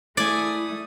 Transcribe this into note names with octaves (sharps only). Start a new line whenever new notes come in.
A3 E4 D5 G#5 D#6